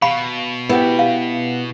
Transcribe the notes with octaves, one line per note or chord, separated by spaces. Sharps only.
B2 F5 B5 C#6
B3 E4 G4
F5